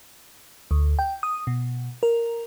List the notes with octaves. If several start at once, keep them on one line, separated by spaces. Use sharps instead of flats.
D2
G5
D#6
B2
A#4